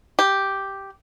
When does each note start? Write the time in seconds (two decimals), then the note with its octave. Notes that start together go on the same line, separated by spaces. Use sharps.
0.19 G4